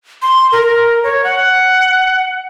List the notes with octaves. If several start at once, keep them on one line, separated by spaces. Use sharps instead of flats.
C6
A#4
C#5
F#5